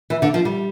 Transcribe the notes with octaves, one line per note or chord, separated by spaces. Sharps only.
E3
D3
F3
G3